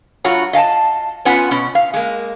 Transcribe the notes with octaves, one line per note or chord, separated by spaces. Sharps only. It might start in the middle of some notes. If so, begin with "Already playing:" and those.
G2 F4 F#4 C#5 A#5
D#5 F5 G#5 A5
B3 C#4 F4 B4 F#5 G#5
B2 C#4
F5
G#3 A#3